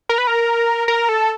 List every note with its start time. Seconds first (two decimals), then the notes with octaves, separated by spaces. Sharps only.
0.09 A#4
0.18 B4
0.27 A#4
0.88 A#4
1.09 A4